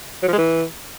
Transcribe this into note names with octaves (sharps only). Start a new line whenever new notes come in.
F#3
F3
G#3
E3